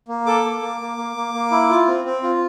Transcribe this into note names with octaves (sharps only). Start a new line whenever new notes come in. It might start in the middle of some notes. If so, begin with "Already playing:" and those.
A#3
A4 D6
A#3
A#3
A#3
A#3
A#3
A#3
E4
F4
C4
C4
F4